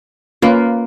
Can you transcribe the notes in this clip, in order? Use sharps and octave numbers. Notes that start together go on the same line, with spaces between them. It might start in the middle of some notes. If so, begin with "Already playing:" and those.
A#3 C#4 F4 B4